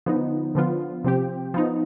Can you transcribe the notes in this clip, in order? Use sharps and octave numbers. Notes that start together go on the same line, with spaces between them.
D3 F3 B3 D#4
D3 F3 B3 F4
C3 F3 C4 G4
F3 B3 D#4